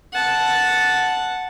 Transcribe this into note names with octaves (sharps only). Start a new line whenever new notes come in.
F#5 A5